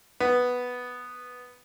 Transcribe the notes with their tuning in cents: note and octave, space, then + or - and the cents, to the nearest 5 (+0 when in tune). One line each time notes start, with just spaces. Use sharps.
B3 +0